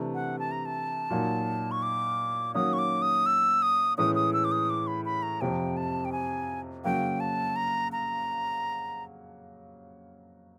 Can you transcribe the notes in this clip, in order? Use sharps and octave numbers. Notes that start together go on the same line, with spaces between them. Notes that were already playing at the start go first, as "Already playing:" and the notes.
Already playing: C3 E3 A3 D4
F#5
A5
A#5
A5
A#2 F#3 A#3 D#4
C#6
D6
D#3 F#3 A#3 C#4 D#6
C#6
D6
D#6
E6
D#6
A2 E3 G#3 C#4 D#6
D#6
E6
D6
D#6
D6
B5
B5
A#5
F2 C3 F3 G5
A5
G5
G#5
C#3 F#3 A#3 G5
A5
A#5
A#5